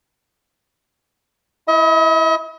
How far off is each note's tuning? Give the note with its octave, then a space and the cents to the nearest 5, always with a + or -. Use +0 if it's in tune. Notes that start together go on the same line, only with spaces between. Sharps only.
E4 +0 D#5 +45